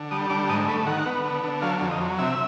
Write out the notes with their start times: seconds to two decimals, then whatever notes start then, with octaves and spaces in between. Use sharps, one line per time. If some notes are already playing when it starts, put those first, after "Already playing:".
Already playing: D3
0.11 G3 D#6
0.30 D3 D6
0.49 G#2 D#6
0.68 A3 B5
0.86 D#3 F#5
1.06 B3
1.25 D3
1.44 D3
1.62 F#3 F5
1.81 F2
1.91 D#5
2.01 F#3
2.19 C3 E5